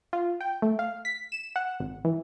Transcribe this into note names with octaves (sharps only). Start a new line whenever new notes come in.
F4
G5
A3
F5
B6
E7
F#5
G#1
E3